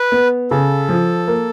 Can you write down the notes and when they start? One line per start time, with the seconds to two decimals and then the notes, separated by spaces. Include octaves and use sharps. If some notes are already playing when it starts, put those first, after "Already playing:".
Already playing: B4
0.12 B3
0.51 C#3 A4
0.89 F3
1.28 A#3